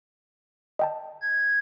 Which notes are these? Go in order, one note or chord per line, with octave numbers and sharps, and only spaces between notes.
D#5 G5 A5
G#6